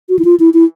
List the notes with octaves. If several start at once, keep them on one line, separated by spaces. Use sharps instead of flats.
F#4
E4
F4
E4
E4